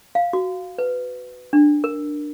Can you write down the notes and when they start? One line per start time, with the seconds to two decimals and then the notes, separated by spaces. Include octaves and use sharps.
0.15 F5
0.33 F#4
0.78 B4
1.53 D4
1.84 A#4